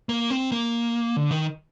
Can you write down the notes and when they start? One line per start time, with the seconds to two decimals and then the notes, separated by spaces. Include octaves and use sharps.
0.09 A#3
0.30 C4
0.52 A#3
1.16 D3
1.31 D#3